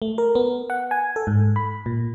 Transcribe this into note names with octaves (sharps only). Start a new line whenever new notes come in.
A3
A#4
B3
F#5
G#5
A4
G#2
B5
A#2